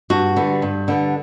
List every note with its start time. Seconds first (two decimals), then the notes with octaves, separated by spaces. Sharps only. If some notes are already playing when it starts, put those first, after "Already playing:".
0.10 G2 F#4
0.36 D3 G3 B3
0.62 G2
0.88 D3 G3 B3